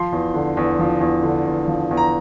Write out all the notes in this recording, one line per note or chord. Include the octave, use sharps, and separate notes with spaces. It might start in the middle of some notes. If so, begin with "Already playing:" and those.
Already playing: F3 C6
E2
D3
E2
F3
E2
D3
E2
F3
E2
A#5